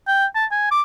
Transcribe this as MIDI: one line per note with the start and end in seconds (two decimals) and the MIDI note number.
0.08 0.26 79
0.35 0.45 81
0.51 0.67 80
0.71 0.82 86